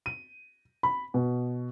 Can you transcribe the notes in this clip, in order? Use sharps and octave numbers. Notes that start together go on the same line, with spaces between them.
D#7
B5
B2